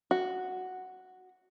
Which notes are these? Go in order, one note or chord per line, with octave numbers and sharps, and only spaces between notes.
F#4